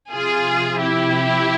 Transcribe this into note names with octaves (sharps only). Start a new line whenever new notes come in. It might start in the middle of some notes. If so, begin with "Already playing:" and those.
C3 F3 F4 G#4
E4 G4